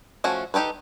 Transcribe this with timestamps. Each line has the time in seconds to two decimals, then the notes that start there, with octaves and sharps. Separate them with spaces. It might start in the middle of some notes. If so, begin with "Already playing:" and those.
0.24 F3 A3 C#4 F#4
0.54 D#4 G4 A4 B4